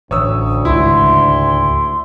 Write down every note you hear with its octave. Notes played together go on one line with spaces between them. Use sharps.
A1 D2 D4 C#5 D#6 E6
C#2 G#2 D#3 E4 C6